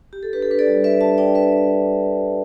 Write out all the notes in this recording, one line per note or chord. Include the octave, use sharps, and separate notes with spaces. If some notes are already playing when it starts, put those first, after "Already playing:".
G4
A4
D4 G4 B4
A4
D4 B4
A4 D5
G3
G3 B4 E5
D4 E5 A5
D4 D5 G5
G3 B4 E5
G3
D4
D4
G3
G3